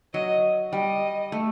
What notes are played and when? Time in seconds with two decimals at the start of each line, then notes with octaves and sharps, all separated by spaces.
0.14 F#3 D#5
0.73 G3 D#5
1.32 A3